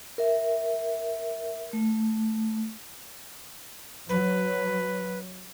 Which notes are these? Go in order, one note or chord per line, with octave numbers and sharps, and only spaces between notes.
A#4 E5
A3
F#3 B4